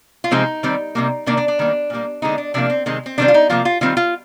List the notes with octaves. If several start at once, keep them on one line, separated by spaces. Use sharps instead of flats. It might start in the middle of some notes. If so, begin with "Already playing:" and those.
F4
C3 F3 G#3 C4 D#4
D#3 G3 C4
C3 G3 A#3
C3 D#3 A#3 D4
D4
D4
D#3 G3 A#3
A#2 G3 A#3
D3 G#3 C4 D#4
D4
C3 F3 A#3 D4
C4
C3 D#3 G#3 C4
C4
C3 D#3 G3 C4 D4
F4
D#4
C3 F3 A#3 F4
F4
D#3 G3 C4 F4
F4